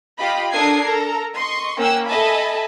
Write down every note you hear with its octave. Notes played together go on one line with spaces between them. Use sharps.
F4 G4 D#5 B5
D4 A4 A#4 D#6 G#6 C7
A4 A#4 A#5
D#5 C6 C#6
A#3 C#4 F#5 G5 E6
A4 D#5 E5 G#5 A5 B5